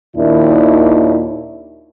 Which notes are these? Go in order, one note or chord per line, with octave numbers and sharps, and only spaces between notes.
D#2 A#2 D#3 D4 E4